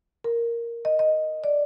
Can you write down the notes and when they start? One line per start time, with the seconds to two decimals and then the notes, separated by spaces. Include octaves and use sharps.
0.24 A#4
0.85 D#5
0.99 D#5
1.44 D5